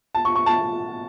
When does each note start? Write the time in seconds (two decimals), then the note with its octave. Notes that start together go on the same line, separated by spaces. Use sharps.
0.15 A5
0.25 C#6
0.36 C#6
0.46 A5